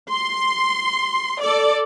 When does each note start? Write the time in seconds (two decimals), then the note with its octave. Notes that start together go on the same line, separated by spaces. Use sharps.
0.11 C6
1.42 A4 D5